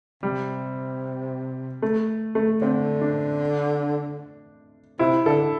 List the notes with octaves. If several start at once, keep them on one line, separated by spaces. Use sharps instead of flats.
C3 G3
A3
A3
D3 C4
D4
C3 E4
D3 A4